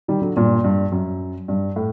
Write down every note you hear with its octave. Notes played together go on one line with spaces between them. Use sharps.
D#3 G3
D3 F#3
G2 A#2
G2
F#2
G2
A2